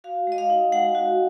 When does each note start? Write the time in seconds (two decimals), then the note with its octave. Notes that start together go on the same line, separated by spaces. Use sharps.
0.04 F#4 F5
0.27 G#3 D#5
0.38 F5
0.50 D#4
0.72 G#3 F#5
0.95 F#4